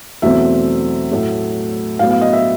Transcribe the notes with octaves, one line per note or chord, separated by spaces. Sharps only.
E2 B2 F#3 A3 C4 E5
A2 F#3 A3
A2 F#3 B3 F5
F5
D#5
E5